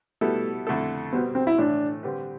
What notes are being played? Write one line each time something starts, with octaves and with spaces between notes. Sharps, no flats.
B2 G3 A3 B3 E4 A4
F2 D3 A3 E4 A4
B2 G3 B3 C4
C4
E4
A2 E3 A3 D4
D3 G3 C4 G4 B4